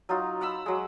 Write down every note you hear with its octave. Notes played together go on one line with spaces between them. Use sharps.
F#3 D#4 F4
F5 F#5 B5 E6
F#3 G#3